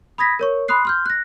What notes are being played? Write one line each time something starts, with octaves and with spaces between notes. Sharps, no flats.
B5 D#6 G#6 A#6 B6
A#4 C#5 C#6
B5 C6 D#6 F#6 C7
C6 F6 G6
F#6 A#6